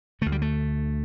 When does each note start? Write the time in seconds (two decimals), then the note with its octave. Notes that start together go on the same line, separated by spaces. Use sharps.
0.21 D2 D3 A3
0.32 G3
0.42 A3